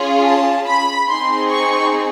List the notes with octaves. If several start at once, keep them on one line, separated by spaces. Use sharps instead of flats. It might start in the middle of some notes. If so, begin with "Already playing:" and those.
Already playing: C#4 F4 G#4
A5
B5
C4 D#4 G#4 C6
C#6